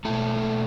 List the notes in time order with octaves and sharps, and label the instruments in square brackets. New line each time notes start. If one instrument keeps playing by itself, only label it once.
[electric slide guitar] B2 A3 E4 A4